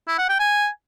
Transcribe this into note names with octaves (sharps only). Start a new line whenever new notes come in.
E4
F#5
G5
G#5